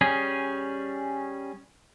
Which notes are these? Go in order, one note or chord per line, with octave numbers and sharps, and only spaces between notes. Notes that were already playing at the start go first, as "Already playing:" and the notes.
G3 C#4 G#4